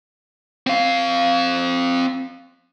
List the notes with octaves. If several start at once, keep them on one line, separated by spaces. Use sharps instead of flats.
C4 F5